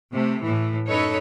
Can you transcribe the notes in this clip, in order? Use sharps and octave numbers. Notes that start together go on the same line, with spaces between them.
C3 A3
A2 E3
F#2 D#4 A4 B4 C#5